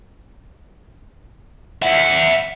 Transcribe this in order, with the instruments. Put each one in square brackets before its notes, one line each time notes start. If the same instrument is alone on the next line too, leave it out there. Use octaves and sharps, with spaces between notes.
[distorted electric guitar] E5 F#5